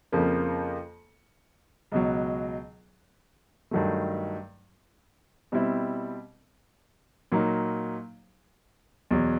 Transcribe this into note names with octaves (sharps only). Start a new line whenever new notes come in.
F2 C#3 F3 A#3
C#2 B2 F#3
G2 D#3 F#3 A3
B2 G3 C4 E4
A#2 F#3 A#3 D#4
E2 B2 F#3